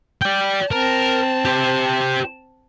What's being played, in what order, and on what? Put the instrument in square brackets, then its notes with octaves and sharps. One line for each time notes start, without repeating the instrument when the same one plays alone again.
[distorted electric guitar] D5 G5
[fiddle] C4 A5 [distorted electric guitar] A#4
[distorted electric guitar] G4 C5